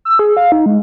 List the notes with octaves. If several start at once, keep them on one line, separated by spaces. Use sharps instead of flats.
E6
G#4
F5
D#4
G#3